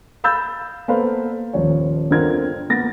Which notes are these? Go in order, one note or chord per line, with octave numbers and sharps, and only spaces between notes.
F5 B5 E6 G6 A6
A#3 B3 A4 B4 C5 F5
D#1 F3 C#5
G1 D3 C4 F4 A#4 G#6
A#3 B3 F#5 A6 A#6